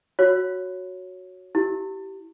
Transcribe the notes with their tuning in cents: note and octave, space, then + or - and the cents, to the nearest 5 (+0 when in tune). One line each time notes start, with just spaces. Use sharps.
F#4 -5 C#5 +0
E4 +0 G4 -25